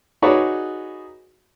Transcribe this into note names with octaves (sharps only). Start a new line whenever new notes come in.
D#4 F#4 G#4 B4 C#5 D5